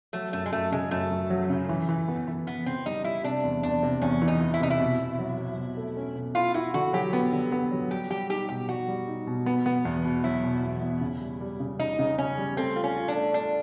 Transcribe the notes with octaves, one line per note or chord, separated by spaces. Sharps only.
F#3 A3
F#2 A3
G#3
F#2 A3
C#3 G#3
F#2 A3
F#2
F#3
C#3
E3
E3
B3
E3
E3 B3
C#3 C4
G3 D#4
G3 E4
C3 D4
E2
E2 D4
C3
E2 C#4
E3
D#4
E3
E4
C3 D#4
E4
B2
B2
F#3
F#3
B2
A3
C#4
B2
E4 F4
E4 F#4
D3 F#4
F#3 G4
B3
D3
B3
F#3
G3 G4
G3 G4
D#4 G4
B2 G4
G3 F#4
G3
D#4
B2
B3
B3
E2
B2
F#3 E4
B2
E2
E2
C#3
G3
G3
C#3
C#3 D#4
C#3
C#3 C#4
G3
A3 C4
F4
C#4
F4
D4
A3
A3 D4